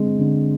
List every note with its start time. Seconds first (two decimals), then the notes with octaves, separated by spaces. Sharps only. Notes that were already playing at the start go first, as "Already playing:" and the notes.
Already playing: D3 G#3 C4
0.19 D3